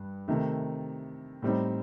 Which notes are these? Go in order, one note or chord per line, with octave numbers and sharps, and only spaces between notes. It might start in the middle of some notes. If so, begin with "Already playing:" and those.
Already playing: G2
C3 D#3 A3
A2 G3 C4 D#4